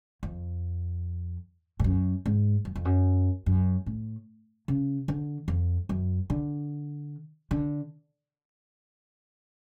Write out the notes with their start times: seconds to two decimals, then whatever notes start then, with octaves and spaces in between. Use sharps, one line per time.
0.23 F2
1.80 G#2
1.84 F#2
2.26 G#2
2.65 F#2
2.75 F2
2.85 F#2
3.46 F#2
3.86 A2
4.68 C#3
5.08 D3
5.48 F2
5.89 F#2
6.30 D3
7.51 D3